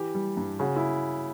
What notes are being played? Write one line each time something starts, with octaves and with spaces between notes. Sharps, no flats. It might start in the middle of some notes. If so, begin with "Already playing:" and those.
Already playing: E3 G4
G3
G2
C#3 F#4
E4